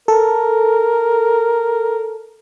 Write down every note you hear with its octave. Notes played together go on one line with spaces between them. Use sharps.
A4 A#4